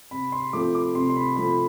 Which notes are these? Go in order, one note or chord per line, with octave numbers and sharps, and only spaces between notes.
C3 B5
C6
F3 A3 C4 D6
D6
C3 C6
C6
B5
F3 A3 C4 B5